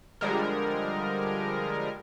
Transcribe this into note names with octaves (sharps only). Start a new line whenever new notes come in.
D3 F3 G3 G#3 A#4